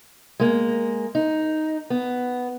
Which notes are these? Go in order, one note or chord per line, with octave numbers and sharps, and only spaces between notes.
G#3 A#3
D#4
B3